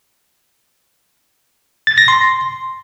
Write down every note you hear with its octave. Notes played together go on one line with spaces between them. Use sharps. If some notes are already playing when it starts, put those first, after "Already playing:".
A6
A#6
C6